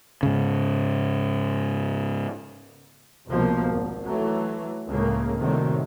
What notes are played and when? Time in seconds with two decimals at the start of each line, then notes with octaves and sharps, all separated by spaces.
0.23 G#2 C#3
3.28 F1 C2 B2 F3 A#3
3.67 G#1
4.06 E3 F#3 A3
4.88 C#2 A2 C#3 A#3
5.38 A2 C3 D#3 F#3 G3